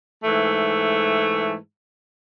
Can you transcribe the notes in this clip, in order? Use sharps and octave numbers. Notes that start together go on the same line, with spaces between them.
G#2 E3 A3